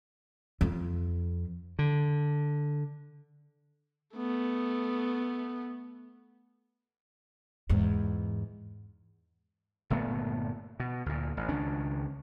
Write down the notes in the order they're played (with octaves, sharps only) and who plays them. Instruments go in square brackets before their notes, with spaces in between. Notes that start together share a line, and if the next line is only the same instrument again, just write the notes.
[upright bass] F2
[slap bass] D3
[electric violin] A3 B3
[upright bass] E2 G#2
[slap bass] G1 A#2 A3 B3
B2
D2 A#2
A1
C#2 D#3 C#4 D4